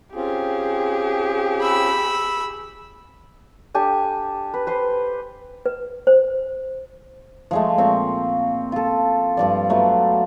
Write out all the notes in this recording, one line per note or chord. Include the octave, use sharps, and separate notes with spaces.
C4 C#4 F4 G4 G#4
B5 E6
D4 G4 A4 G#5
B4
B4 C5 C6
B4
C5
F3 G#3 A3
A#2 C4 C#6
F4 A4
G2 F3 D5
F3 F#3 A3 B3